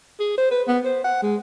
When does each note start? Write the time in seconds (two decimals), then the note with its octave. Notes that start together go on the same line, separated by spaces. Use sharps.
0.20 G#4
0.38 C5
0.51 B4
0.68 B3
0.85 C5
1.04 F#5
1.23 G#3